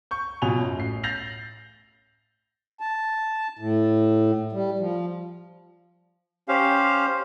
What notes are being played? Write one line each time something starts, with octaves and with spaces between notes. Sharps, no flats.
C#6 G6
B2 F#3 F4 G#5 F7 G7
F#2
A1 C7
G6 A6 A#6 C7 F7 F#7
A5
A2
G3
F3
C#4 G4 C5 F5